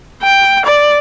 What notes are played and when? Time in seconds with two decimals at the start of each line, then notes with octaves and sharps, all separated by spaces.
0.22 G5
0.65 D5